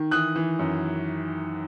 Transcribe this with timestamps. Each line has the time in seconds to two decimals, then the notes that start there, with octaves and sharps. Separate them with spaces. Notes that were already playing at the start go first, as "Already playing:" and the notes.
Already playing: D#3
0.11 E3 D#6 F#6
0.36 E3
0.59 F#2